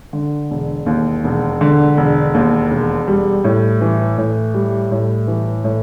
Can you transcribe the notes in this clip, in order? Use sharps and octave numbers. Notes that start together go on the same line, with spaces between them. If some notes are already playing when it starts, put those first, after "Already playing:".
D3
E1
D#2
E1
D3
E1
D#2
E1
G3
A2
E3
A2
G3
A2
E3
A2